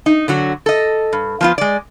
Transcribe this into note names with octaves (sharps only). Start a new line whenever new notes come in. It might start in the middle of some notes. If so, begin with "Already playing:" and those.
D#4
D3 F#3 F#4
A4 D#5
G2
F3 B3 F4
G#3 D5